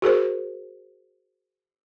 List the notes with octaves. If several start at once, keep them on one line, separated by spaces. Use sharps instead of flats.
F#4 G#4 A#4 C5